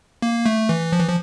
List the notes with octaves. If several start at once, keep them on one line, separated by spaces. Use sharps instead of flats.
A#3
A3
E3
F3
E3
F3